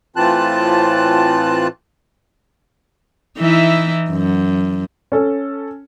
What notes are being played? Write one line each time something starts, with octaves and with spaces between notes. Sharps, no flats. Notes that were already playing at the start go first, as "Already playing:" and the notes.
A2 E3 C4 F4 A5 F#6
E3 D#4 E4
F#2
C#4 A4